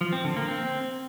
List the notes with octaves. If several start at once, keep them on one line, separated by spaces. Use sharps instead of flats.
F3
C4
D3
A#3
C4